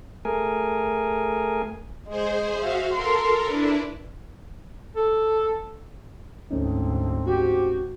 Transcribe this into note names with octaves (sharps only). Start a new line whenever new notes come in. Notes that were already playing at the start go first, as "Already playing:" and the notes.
A3 G#4 A#4 G#5
G#3 G#4 C5
F#4 E5 F5
A4 A#4 C6
D4 E4 B4
A4
D2 G#2 A3 C4 C#4 D#4
C4 F#4 G4